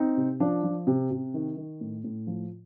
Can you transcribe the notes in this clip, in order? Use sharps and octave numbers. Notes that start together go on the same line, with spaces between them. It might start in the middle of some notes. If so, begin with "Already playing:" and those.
Already playing: C4 D#4
C3
F3 D4
F3
C3
C3
D#3
D#3
A2
A2
F3